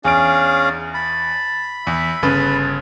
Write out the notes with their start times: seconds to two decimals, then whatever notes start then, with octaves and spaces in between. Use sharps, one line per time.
0.05 E2 C#4 D4 G#4 F5 D7
0.95 A5 B5
1.87 E2 E5
2.22 G1 C#3 B4 A5